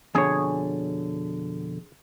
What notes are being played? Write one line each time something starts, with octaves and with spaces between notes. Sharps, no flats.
F2 B2 D3 G#4 C#5